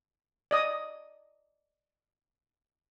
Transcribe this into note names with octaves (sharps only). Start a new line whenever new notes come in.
D5 D#5 D#6